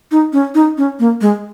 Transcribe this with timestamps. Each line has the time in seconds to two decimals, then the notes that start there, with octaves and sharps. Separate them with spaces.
0.11 D#4
0.33 C#4
0.55 D#4
0.78 C#4
0.99 A#3
1.21 G#3